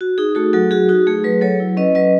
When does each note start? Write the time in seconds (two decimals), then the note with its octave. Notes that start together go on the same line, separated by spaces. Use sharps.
0.01 F#4
0.18 D#4 G#4
0.35 A3 F#4 A4
0.53 F#3 F#4 A4
0.71 F#4 G#4
0.88 D#4 F#4
1.07 A3 G#4
1.24 F#3 G#4 B4
1.41 F#3 A4 C#5
1.60 E4
1.77 C#4 B4 D#5
1.95 F#3 B4 D#5